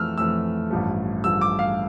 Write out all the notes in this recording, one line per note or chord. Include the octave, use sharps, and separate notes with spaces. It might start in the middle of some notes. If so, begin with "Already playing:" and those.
Already playing: F2 E3 A3 E6 F6
F2 E3 A3 E6
A1 G2 F3 A3
A1 G2 F3 A3 E6
D6
F5